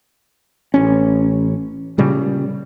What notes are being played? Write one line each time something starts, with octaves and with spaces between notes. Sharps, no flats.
A1 C#4
A#2 C#3 G3